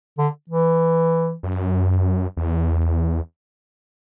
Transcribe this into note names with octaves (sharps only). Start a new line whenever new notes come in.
D3
E3
F#2
E2